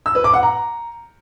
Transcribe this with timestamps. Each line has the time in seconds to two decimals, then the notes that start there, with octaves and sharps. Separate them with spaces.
0.06 E6
0.15 B4
0.24 D6
0.34 F#5
0.43 A#5